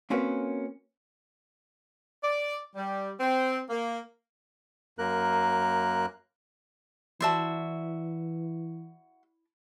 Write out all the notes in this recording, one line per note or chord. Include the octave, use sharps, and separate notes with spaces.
A#3 C4 C#4 F#4 A#4 B4
D5
G3
C4
A#3
F#2 A#3 A#4 F#6
E3 E4 F#4 D5 E5 A5 C6